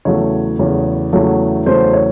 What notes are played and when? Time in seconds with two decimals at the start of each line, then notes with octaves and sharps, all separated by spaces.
0.05 E2 C#3 F#3 A3 C#5
0.59 E2 C#3 F#3 A3
1.13 E2 C#3 F#3 A3
1.66 E2 C#3 F#3 A3 C5
1.93 C#5